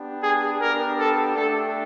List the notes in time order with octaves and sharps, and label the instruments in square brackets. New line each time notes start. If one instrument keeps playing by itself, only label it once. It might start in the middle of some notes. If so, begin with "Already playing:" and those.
Already playing: [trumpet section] B3 D4 G4
G#4
B3 D4 G4 A#4
A4
A3 D4 G4 A4